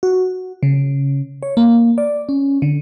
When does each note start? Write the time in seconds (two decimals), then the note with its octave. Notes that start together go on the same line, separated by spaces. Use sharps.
0.03 F#4
0.63 C#3
1.43 C#5
1.57 A#3
1.98 D5
2.29 C#4
2.62 D3